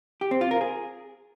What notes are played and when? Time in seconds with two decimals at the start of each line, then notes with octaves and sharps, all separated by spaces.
0.21 G4
0.31 C4
0.41 F4
0.51 A#4
0.61 G#4